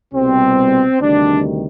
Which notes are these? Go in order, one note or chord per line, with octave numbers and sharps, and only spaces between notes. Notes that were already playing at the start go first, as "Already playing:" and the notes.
C2 B2 G3 C4
D2 C3 D#3 G3 D4